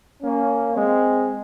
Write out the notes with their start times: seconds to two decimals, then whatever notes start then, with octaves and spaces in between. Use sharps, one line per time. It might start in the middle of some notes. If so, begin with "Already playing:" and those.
0.21 A#3 C#4
0.74 G#3 C4